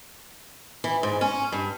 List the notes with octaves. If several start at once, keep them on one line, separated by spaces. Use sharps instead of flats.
E3
G#2
C#4
G2